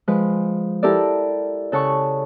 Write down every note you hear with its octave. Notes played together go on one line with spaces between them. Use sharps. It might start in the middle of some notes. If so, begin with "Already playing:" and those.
F3 G#3 B4
E4 G4 A4 A#4 D5
C#3 A4 F#5 C#6